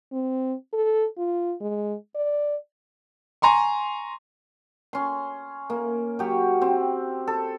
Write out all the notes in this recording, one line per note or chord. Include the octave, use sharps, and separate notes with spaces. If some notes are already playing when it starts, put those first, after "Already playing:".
C4
A4
F4
G#3
D5
G#5 A#5 C6 C#6
C#4 C6
A#3
F#3 G4
C4
A4